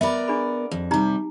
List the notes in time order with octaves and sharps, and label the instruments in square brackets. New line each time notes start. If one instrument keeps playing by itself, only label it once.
[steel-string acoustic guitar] B3 A#4 D5 [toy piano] E5 B5
[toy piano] D4 G#4 B5
[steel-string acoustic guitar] F2
[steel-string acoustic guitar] C3 G3 [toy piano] D#4 G4 A#5